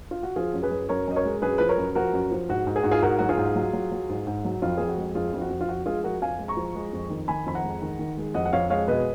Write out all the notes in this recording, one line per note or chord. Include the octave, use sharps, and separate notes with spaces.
F4
F#4
F3 F4 G#4
F#2
G#4 B4
F#2
F#2 A#4 C#5
F#2 D#5
A#4 C#5
G#3
F#2 G#4 B4
F3 B4
A#4 C#5
F#2
F3 F#4 A#4
F#2
F3
G#2 F#4
G#2
G#4
G#2 F#4
F4 G#4
G#2 F#4 A#4
F#3 F#4
F4 G#4
G#2
F#3
F#3
F#3
G#2
G#2
F#3
F2 F4
F2 G#4
F#4
G#3
F2 F4 G#4
F2 F4
F#4
F2
F4
F3 F#4
G#3 F4 G#4
F3 F#4 A#4
F2 F5 G#5
G#3
A#5 C#6
F3
G#3
F2
D#3
D#3 G#5 B5
F2 B5
F#5 A#5
G#3
D#3
D#3
G#3
F2 D#5 F#5
F#5
F2 C#5 F5
G#3 C#5 F5
B2 B4 D#5